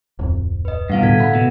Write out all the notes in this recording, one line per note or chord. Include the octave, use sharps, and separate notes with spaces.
D1 F2
B4 D#5
G2 B2 E4 F5 F#5
A2 D3 A4 G#6 B6
E5 F#5 B5
B2